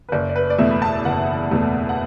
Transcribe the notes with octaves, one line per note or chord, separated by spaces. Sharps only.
B4
F#1 D5
D5
B4
D5
E2 B2 A3 E5
B5
A5
F#1 F#5
E2 B2 A3
F#5